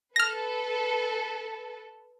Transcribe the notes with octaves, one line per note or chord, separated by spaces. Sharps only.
A4 B4 F6 A#6